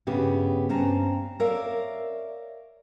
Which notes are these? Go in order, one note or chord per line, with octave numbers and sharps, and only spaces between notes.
G2 C#3 B3 G4
G2 C4 C#4 A5 A#5
A#4 C#5 D5 E5 F5